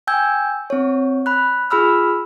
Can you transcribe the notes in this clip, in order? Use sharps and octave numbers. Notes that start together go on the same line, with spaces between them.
G5 G#5 E6 G6 G#6
C4 C#5
B5 F#6
F4 G#4 B5 E6 F6